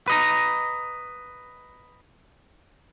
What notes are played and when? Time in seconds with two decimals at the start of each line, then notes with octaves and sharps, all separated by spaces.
0.08 B4 D#5 A#5